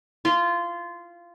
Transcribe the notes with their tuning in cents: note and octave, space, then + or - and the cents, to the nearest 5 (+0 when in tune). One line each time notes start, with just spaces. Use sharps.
F4 -15